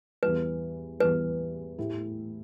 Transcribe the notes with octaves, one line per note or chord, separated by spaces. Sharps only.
E2 E3 G3 B4
E2 E3 G3 B4
A2 A3 E4 G4